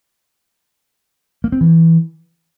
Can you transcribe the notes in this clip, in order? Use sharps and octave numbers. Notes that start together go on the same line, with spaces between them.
A#3
C4
E3